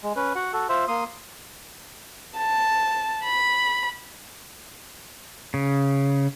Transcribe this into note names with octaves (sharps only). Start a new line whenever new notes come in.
G#3
C#4 B4
F#4 F#5
F#4 A4
F4 C5 E5
A#3 C6 D#6
A5
B5
C#3